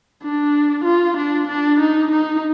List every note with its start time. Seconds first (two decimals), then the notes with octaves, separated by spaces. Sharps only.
0.22 D4
0.84 F4
1.17 D4
1.48 D4
1.80 D#4
2.11 D#4